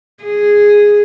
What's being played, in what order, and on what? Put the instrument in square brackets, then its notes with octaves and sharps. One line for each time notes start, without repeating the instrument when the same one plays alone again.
[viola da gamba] G#4